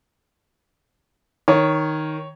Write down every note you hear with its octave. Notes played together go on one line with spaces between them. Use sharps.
D#3 C#5